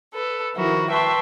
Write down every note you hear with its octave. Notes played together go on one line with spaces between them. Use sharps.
A4 B4
D#3 F3 E4 F#4 A#4
B4 E5 G5 A5 C6 C#6